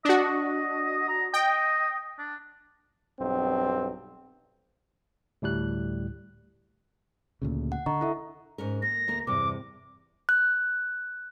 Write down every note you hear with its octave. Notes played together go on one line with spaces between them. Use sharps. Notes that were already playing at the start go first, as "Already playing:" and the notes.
D4 F#4 D#5
A#5
D#5 G5
D4
B1 G2 C4
D2 A2 G3 F#6
D2 A#2 C#3
F#5
D3 D#5 A#5 C#6
E4 A4 E5
G#2 C#4 A#4
A#3 A#6
D2 A#3 A#4
E2 G2 C3 D6
F#6